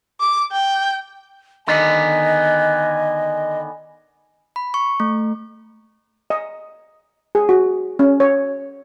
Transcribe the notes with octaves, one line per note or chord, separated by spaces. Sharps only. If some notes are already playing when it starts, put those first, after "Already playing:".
D6
G5
D3 D#3 B3 D#5 G#5
B5
C#6
A3
D#5
G#4
F#4
C#4
C#5